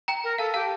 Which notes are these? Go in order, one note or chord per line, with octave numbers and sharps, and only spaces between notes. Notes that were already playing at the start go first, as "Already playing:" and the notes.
G5 A#5
A#4
A4 F5 A5
G4 F5 A5